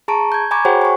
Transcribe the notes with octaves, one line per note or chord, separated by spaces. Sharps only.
G#4 A5 A#5 C#6 D7
G6 G#6
G#5 A#5 B5 C#6 D6 G#6
F#4 G#4 C5 C#5 F#5 G5
G#5 C#6